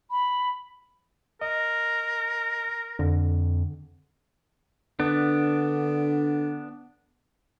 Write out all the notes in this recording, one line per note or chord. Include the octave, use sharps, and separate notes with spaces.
B5
A#4 D#5
F2 D3
D3 B3 D4